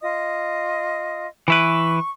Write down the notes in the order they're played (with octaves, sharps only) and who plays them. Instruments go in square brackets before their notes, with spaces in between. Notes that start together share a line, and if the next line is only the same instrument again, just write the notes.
[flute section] F4 D#5 D#6
[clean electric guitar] E3 E4 B4 [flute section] C#6